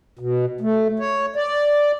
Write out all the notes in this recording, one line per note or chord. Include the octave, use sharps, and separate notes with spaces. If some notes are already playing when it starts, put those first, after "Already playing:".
B2
A3
C#5
D5